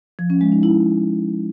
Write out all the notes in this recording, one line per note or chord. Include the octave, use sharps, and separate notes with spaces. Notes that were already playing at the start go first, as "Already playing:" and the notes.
F3
C#4
G#3
D#4
E4